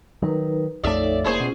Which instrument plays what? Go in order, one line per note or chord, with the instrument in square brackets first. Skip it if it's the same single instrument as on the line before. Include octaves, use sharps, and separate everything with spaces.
[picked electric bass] D#3 F#3 [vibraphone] D#4 A#4 B4
[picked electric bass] A#1 F2 A3 [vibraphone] D#4 A4 C#5 [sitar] D5 E5
[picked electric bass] F1 A#3 [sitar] E4 G#4 C5
[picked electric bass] B2 [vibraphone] C#4 F4